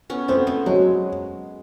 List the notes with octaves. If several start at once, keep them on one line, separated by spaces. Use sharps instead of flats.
B3 C#4
A3 B3 C4
A3
F#3 G#3